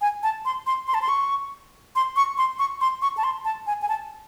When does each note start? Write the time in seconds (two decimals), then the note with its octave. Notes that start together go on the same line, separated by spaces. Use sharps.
0.01 G#5
0.23 A5
0.45 C6
0.67 C6
0.88 C6
0.94 A5
1.02 C6
1.09 C#6
1.96 C6
2.16 C#6
2.38 C6
2.59 C#6
2.81 C6
3.02 C#6
3.17 A5
3.24 C6
3.45 A5
3.67 G#5
3.82 G#5
3.89 A5